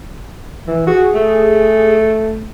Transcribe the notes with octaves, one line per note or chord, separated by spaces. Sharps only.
E3
F#4 G#4
A3